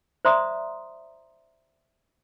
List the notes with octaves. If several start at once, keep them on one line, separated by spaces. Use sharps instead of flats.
C5 D5 E5 A#5 C6 D#6